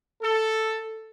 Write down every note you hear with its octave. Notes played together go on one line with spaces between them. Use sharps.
A4